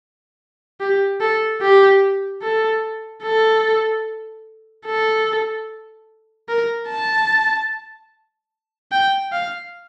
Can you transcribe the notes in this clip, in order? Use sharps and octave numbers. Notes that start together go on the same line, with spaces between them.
G4
A4
G4
A4
A4
A4
A#4
A5
G5
F5